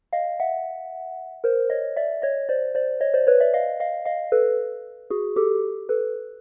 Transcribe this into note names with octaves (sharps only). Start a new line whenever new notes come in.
D#5 F5
E5 F#5
A#4 C5
C#5 D#5
D5 E5
C#5 D#5
C5 D5
C5 D5
C#5 D#5
C5 D5
B4 C#5
D5 E5
D#5 F5
D#5 F5
D#5 F5
A4 B4
F#4 G#4
G4 A4
A4 B4